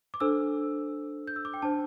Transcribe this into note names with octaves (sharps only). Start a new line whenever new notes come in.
D6
D4 A4 C5 E6
G6
E6
D6
G5
D4 C5 A5